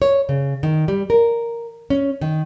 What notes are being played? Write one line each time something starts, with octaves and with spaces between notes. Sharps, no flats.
C#5
C#3
D#3
G3
A#4
C#4
D#3